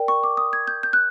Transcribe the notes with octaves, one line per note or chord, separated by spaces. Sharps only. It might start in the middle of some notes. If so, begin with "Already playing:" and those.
Already playing: A#4 D5 G5
C#6
D6
D#6
G#6
G6
G6
F#6